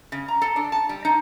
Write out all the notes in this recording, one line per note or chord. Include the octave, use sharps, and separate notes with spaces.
C#3
A#5
A4
D4
A5
G3
D#4